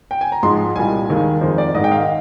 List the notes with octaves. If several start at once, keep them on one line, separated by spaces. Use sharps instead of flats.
G5
G#5
A#5
G#2 F3 G#3 C6
C2 A#2 G3 G#5
D#2 D#3 G#3
F2 D#3 G#3 C5
D5
G#2 D#3 G#3 D#5
G5
F5